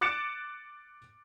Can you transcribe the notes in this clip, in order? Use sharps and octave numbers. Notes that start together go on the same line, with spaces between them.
D6 F#6 A6 C#7 D7 E7